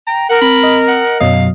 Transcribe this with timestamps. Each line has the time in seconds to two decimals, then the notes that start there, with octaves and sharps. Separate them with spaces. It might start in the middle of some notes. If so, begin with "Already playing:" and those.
0.07 G5 A#5
0.29 A#4 F#5
0.41 C4 B5
0.63 D#5
0.88 F#5
1.20 F#2 B2 F#3 D#5 F5